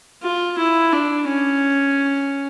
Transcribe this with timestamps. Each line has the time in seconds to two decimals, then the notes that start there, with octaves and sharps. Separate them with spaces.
0.23 F4
0.58 E4
0.92 D4
1.27 C#4